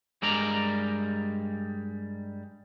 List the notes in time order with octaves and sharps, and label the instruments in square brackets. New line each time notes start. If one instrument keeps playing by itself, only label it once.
[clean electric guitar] G2 G3 G#3 A#4 D5 A#5